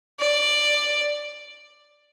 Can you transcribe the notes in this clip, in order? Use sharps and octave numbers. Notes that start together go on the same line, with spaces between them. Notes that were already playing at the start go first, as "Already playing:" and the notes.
D5